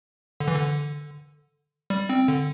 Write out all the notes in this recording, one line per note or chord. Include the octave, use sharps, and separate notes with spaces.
D3
E3
D3
G3
C4
D3